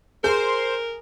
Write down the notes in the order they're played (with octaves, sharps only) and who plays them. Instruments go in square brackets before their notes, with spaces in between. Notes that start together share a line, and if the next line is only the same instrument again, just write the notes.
[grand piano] G#4 [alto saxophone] A#4 [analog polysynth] C5